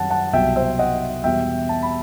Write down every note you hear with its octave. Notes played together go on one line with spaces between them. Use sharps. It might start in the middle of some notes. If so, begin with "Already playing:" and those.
Already playing: F#2 D#3 G3 F#5 A5
F#5 A5
C2 B2 F#3 E5 G5
C5 E5
D#5 F#5
E2 B2 G3 E5 G5
A5
B5